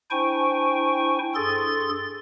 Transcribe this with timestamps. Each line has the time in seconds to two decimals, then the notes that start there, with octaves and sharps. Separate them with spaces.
0.11 D4 E4 C5 G5 G#5 C#6
1.35 G2 G#4 A4 C6 A6